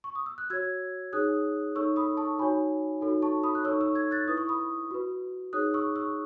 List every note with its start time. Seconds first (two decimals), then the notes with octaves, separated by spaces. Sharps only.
0.04 C#6
0.15 D#6
0.26 E6
0.38 F#6
0.50 F#4 C#5 E6 G#6
1.13 D#4 G#4 C#5 D#6 F#6
1.75 D#4 A4 C#5 C#6 E6
1.96 B5 D#6
2.17 A5 C#6
2.39 D#4 F#4 C#5 G#5 B5
3.01 D#4 F#4 A4 C#5
3.22 A5 C#6
3.43 B5 D#6
3.55 F#6
3.64 D#4 A4 C#5 C#6 E6
3.81 C#6 E6
3.95 E6 G#6
4.11 F#6 A6
4.28 E4 B4 D#6
4.37 C#6
4.49 B5 D#6
4.91 F#4 B4
5.53 D#4 G#4 C#5 D#6 F#6
5.74 C#6 E6
5.96 C#6 E6